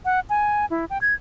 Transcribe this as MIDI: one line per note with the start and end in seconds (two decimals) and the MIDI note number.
0.05 0.20 78
0.29 0.66 80
0.70 0.85 64
0.90 0.98 79
1.01 1.14 92